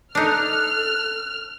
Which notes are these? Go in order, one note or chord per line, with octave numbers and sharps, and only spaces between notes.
D4 D#4 A4 F6 F#6